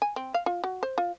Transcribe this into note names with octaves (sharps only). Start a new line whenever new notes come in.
G#5
C4
F5
F4
F#4
C5
F4